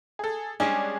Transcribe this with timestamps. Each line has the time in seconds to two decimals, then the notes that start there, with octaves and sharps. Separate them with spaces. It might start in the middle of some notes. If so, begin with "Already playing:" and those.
0.19 G#4 A4
0.60 G3 G#3 C#4 D4 G#4